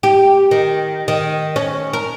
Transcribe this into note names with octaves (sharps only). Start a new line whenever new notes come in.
G4
D#3
D#3
C#4
A#4